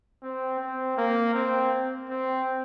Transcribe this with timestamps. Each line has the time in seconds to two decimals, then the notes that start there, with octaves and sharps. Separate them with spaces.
0.23 C4
0.59 C4
0.97 A#3
1.34 C4
2.09 C4